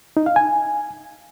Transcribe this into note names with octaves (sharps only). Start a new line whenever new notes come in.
D#4
F5
G#5